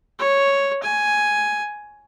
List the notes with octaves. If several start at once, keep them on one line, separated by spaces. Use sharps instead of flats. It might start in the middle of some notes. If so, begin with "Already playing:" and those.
C#5
G#5